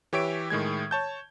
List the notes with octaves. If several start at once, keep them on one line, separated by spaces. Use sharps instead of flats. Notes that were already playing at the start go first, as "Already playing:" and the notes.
E3 G4 C#5 E5 D7
A2 D#3 G#3 G#6
C#5 A5 G6